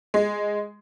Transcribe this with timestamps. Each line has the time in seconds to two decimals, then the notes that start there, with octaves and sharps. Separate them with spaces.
0.14 G#3